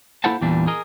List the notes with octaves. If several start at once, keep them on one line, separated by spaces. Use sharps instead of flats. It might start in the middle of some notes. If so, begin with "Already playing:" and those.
A#3 E4 A4 C5 F#5 A5
E2 A#2 E3 G3 D4
G#4 A#4 D#5